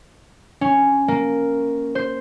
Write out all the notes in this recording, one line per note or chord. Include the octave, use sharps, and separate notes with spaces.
C#4
A#3
C5